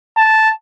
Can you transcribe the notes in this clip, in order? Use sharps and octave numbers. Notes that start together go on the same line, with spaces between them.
A5